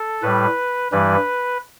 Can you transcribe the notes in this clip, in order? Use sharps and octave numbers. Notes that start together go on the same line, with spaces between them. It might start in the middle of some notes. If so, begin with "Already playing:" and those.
Already playing: A4
A2 G3 B4
G2 E3 G3 B4